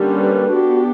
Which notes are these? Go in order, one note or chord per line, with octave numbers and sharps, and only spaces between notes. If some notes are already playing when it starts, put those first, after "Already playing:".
Already playing: D3 G3 A#3 C#4
B4
B3 D4 F#4 G4